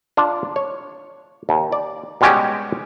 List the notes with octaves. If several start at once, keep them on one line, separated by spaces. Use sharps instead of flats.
D4 F4 F5
C#5
D#2
D5
B2 G3 G#3 C#4 F#4 G4